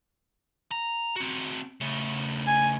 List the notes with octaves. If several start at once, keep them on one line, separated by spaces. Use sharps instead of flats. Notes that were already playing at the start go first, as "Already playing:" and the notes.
A#5
C4 F#4
C#3 A3
G#5